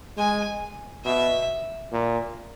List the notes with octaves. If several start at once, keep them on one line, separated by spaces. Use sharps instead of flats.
G#3 G#5
B2 E5
A#2